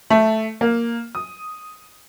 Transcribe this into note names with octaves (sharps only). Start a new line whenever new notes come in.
A3
A#3
D#6